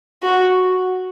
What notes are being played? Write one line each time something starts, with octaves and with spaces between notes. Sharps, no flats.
F#4